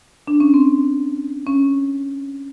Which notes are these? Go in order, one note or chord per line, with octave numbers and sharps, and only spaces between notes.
D4
C#4
C4
C#4